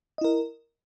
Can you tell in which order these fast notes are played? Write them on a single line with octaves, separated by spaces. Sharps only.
D#5 E4 A#4